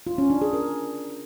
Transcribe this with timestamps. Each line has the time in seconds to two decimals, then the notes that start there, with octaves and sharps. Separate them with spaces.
0.07 F4
0.18 C#4
0.30 D4
0.42 G#4
0.53 A#4